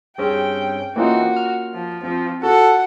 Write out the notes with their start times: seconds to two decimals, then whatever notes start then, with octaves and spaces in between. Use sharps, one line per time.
0.18 G2 C4 C#4 G#4 G5
0.96 E3 A#3 C4 C#4 D#4 F4 F#4
1.36 F6
1.74 F3
2.03 F3 C4
2.43 F#4 A4 F#5